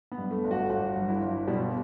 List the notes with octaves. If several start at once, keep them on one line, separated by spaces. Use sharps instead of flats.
B3
G2
A3
G1
F#4
G1 F#4
G2
E4
G1
B2 G3